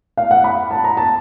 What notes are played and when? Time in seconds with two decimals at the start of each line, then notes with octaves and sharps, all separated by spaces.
0.17 F5
0.31 F#5
0.44 B5
0.71 A5
0.84 A#5
0.97 A5